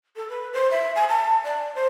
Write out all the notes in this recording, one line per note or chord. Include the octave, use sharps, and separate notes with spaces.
A4
B4
C5
E5
G#5
A5
D5
C5